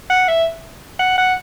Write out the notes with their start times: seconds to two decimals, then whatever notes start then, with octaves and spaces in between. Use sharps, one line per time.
0.10 F#5
0.28 E5
0.99 F#5
1.18 F#5